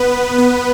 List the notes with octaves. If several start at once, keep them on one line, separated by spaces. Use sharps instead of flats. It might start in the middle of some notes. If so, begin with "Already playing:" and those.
Already playing: B3 B4
B3 B4